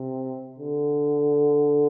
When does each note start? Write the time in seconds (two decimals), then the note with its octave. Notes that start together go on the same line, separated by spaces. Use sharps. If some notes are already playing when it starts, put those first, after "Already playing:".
Already playing: C3
0.58 D3